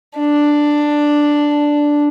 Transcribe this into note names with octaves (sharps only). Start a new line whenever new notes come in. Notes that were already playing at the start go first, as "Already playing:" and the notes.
D4